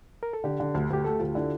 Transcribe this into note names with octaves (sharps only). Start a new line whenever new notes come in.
A#4
A4
D3 G4
D3
D2
D2 G4
A3 A4
D2 F4
D3 E4